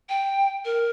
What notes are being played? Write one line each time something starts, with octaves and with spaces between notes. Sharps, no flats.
G5
A#4